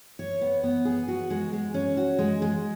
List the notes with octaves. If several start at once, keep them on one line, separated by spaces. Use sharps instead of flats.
C#5
B3
B3
G#4
F#4
G#3
G#3
C#4
F#4
G#3
G#3